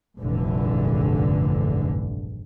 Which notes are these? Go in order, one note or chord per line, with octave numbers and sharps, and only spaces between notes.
F1 A#1 G2 D3 E3